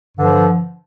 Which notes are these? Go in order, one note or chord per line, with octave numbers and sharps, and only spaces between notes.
G2 D3 F3